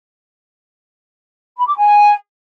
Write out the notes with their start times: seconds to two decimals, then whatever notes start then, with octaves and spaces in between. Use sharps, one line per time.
1.57 B5
1.67 D6
1.77 G#5